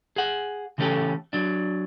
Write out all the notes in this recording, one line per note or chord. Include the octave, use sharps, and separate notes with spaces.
G#4 F#5
C#3 E3 A3 C#4 G4 A4
F#3 D4